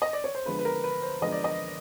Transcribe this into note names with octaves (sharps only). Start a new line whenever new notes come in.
D#5
D5
C#5
C5
D3 F3 G#3 B3 B4
B4
A#4
B4
C5
D3 F3 G#3 B3 D#5
D5
D#5